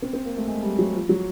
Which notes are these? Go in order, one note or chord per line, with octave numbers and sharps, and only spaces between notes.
C4
C4
A#3
A3
G#3
G3
F#3
F3
F#3